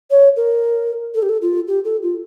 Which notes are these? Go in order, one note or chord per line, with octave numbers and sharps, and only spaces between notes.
C#5
A#4
A4
G4
A4
F4
G4
A4
F4